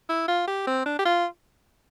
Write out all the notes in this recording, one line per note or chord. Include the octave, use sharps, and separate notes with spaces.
E4
F4
G4
C4
D4
G4
F4